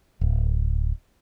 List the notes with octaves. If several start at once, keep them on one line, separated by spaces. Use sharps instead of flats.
D1